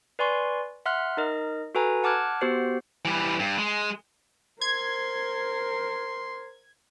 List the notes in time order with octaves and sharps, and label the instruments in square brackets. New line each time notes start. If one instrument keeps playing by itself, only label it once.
[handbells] B4 D5 G#5 C6 C#6
E5 F#5 C6 F6 F#6
D#4 A#4 D#5
F#4 A4 B4 G#5 A#5
F#5 A5 D6 F6 F#6 G#6
B3 F#4 G4 C5 C7
[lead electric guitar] E3 G3
G2
G#3
[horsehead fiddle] A#4 C5 [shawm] C6 [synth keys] G#6